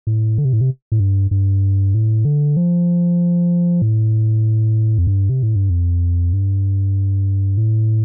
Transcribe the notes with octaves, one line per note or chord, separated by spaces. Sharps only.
A2
D3
C3
A2
C3
A2
G2
G2
A2
D3
F3
A2
F2
G2
C3
A2
G2
F2
G2
A2